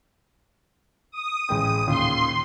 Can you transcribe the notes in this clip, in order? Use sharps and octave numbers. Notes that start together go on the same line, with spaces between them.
D#6
A1 G#3 G5
D#2 A#2 C#3 C6